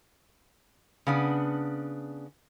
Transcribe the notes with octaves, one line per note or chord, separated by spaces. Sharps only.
C#3 B3 D4